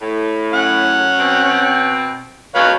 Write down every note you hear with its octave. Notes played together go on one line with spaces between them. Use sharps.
A2
C#4 F#5
B2 C4
F#2 B2 B4 C#5 F5